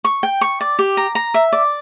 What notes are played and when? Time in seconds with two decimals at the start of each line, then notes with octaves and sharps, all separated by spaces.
0.04 C#6
0.23 G5
0.41 C#6
0.61 D5
0.79 G4
0.97 A#5
1.15 A#5
1.34 E5
1.53 D5